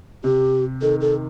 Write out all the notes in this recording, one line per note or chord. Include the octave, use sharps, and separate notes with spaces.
C3 G4
D#3 A4
A4